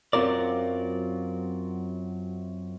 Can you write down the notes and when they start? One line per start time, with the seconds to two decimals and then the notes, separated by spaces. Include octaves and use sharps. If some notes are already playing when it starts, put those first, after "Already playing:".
0.13 F#2 F#3 C4 F4 A#4 D5